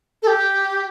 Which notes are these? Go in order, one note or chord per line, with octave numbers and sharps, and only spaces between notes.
A4
G4